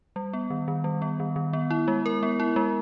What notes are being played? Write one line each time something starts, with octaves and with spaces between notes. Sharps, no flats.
G3
B3
D#3
D#3
G3
B3
D#3
D#3
B3
E4
G#3
A#4
B3
E4
G#3